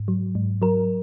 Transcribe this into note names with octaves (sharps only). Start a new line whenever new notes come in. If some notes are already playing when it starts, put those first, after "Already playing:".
Already playing: G#2
F#3
G#2
F#3 A#4